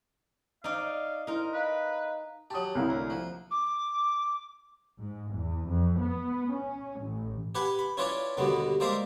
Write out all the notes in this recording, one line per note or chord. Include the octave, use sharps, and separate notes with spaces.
D#4 D5 F5
D#4 E4 A#4 C6
B4 D#5 F5 A#5
F#3 G4 A5 D#6
C2 A#3 E4
D2
F3
D6
G#2
E2
F2
B3
C#4
A1
G4 B4 F#5 G#5 B5
B5
C#4 E4 F4 B4 C#5 D5
D#2 B2 D3 G3 B3
G#3 A#3 C5 D5 E5 F5